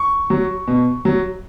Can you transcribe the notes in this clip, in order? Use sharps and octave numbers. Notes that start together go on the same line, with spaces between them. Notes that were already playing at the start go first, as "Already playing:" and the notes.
Already playing: C#6
F#3
B2
F#3